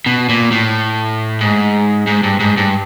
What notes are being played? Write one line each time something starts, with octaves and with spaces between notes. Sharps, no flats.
B2
A#2
A2
G#2
G#2
G2
G#2
G2